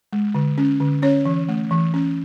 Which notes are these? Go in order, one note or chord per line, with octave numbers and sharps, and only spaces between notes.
G#3
D3
C#4
D3
C#4 C#5
E3
A3
E3
C#4